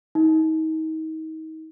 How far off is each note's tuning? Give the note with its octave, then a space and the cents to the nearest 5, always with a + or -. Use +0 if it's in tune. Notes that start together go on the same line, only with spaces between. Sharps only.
D#4 +35